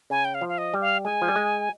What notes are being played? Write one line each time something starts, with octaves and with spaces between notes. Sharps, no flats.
C#3 G#5
G5
F5
F3
F5
D#5
G3
F5
G#3 G#5
F3
G3
G#3